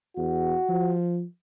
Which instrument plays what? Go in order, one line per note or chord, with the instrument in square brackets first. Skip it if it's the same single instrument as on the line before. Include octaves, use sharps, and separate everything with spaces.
[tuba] E2 [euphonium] F#4
[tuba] F3